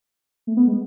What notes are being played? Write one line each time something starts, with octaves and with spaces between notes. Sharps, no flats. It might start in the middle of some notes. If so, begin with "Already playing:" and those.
A3
B3
G#3